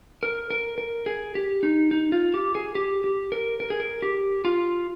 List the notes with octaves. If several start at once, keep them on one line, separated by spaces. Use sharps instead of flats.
A#4
A#4
A#4
G#4
G4
D#4
D#4
F4
G4
G#4
G4
G4
A#4
A#4
G#4
A#4
G4
F4